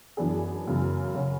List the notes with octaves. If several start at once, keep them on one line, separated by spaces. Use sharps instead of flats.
F#2 E3 B3 D4 G#4
F#2 C#3 E3 B3
C#3 F#3 C#4 F#4